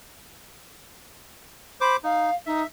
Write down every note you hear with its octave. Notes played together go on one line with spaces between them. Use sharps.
C5 B5 D6
D#4 F5
D#4 E5